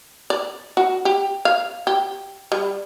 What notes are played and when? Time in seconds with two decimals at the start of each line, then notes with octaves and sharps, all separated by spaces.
0.30 D5
0.77 F#4
1.05 G4
1.45 F5
1.87 G4
2.52 G3